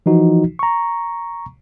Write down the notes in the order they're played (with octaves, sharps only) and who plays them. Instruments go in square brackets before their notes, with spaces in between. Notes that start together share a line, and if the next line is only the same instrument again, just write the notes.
[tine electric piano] E3 F3 D#4 F#4
A#5 C#6